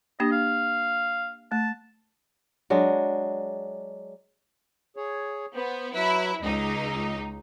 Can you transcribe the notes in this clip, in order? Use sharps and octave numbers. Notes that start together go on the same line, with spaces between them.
A#3 D4 G4 D#5
F5
A3 A5
F#3 G#3 D4
G#4 C#5
B3 C5
F#3 E4 B4
C#2 D#4 D#5